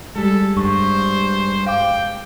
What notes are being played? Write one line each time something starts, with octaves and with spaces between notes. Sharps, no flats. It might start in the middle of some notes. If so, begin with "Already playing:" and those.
G3 G#3 A4
G2 C5 C#6
F5 G5 D6